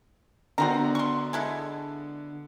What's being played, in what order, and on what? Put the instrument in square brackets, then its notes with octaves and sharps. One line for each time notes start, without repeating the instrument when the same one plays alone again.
[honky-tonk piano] D3 B3 F#4 [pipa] D#3 C4 A#5
[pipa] C6 C#6
G#3 E4 A4